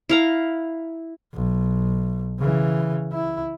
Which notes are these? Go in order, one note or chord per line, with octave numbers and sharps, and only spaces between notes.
E4 F5 A#5
B1
C#3 E3
E4